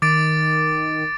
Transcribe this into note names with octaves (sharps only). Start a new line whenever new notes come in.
D#3 D6 A6 D7